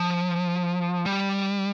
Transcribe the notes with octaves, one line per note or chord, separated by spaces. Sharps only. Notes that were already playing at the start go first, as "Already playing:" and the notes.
Already playing: F3
G3